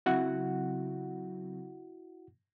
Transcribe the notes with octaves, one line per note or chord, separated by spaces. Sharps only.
C#3 F#3 C4 E4 F#4 F#5